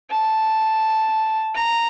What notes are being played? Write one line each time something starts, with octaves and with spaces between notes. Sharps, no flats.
A5
A#5